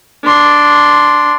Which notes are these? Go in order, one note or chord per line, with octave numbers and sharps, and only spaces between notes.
D4 C6